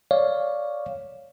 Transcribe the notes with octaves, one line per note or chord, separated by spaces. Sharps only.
C#5 D5 F5